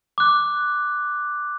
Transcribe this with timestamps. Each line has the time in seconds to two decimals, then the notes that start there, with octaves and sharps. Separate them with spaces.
0.18 D6 F#6